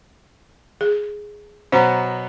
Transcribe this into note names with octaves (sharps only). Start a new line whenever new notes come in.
G#4
B2 F#3 B3 C5 A#5